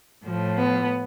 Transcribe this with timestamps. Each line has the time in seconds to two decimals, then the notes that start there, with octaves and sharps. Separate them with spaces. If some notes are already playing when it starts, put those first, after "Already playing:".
0.24 A2 F3
0.56 B3